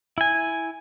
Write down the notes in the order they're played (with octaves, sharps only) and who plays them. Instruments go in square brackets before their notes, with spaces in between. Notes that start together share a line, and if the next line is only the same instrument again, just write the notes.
[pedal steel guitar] E4 G#5